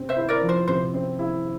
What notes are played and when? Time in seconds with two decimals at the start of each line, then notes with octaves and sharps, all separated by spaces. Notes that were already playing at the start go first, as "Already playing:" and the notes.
Already playing: C3 C4
0.09 C5 E5
0.16 E4
0.29 A#4 D5
0.41 F3
0.49 C5
0.68 C3 C5
0.94 C4
1.19 E4